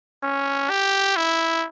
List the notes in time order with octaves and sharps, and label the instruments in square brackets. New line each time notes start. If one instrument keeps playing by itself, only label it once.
[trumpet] C#4
G4
E4